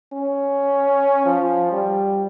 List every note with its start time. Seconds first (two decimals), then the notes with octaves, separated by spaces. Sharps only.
0.13 C#4
1.26 F3
1.72 G3